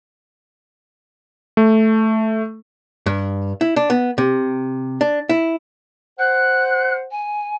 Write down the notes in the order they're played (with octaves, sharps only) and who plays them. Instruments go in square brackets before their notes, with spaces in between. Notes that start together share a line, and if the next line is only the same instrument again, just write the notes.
[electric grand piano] A3
[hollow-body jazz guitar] G2
E4
D4
B3
C3
D4
E4
[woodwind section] C5 F#5 [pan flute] F#6
[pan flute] G#5